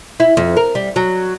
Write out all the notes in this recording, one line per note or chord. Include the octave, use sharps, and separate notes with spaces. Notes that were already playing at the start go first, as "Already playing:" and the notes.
E4
F2
A#4
G3
F#3